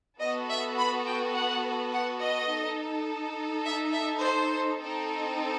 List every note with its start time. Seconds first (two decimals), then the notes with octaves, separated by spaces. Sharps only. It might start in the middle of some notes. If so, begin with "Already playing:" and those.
0.20 B3 F#4 A4 D#5
0.49 E5
0.78 B5
1.06 G5
1.34 F#5
1.93 F#5
2.20 D#5
2.49 D#4 A4
3.65 E5
3.93 E5
4.21 C5
4.79 C4 D#4 A4